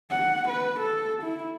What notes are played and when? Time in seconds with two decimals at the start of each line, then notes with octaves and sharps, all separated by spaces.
0.10 F#5
0.49 B4
0.80 A4
1.23 E4